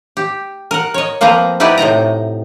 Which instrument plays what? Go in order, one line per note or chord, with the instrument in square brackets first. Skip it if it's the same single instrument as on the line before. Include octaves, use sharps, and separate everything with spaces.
[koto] G4
A#4 F#5
C#5 D#5
F3 A#3 C4 B4 A#5
D#4 E4 F#4 G4 B4 D5
A2 C3 D#5 A#5